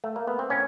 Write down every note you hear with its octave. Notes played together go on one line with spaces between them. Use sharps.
A3
A#3
B3
C4
A2 C#4